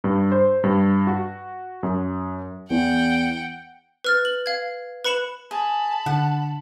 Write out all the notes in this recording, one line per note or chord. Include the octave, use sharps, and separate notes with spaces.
G2
C5
G2
F#4
F#2
E2 F#5 G5
B4 F6 A6
F#7
F5 G#6
B4 B5 C#7 E7 F#7
G#4 A5 B5
D3 F#5